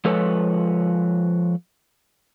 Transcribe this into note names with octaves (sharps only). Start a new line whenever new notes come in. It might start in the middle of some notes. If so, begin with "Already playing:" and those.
F3 G#3 A4 B4 C#5